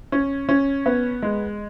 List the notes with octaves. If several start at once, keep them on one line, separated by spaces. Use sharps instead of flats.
C#4
C#4
B3
G#3